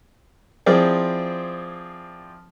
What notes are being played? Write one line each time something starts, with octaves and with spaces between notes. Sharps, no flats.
F3 C4 E4 G#4 D5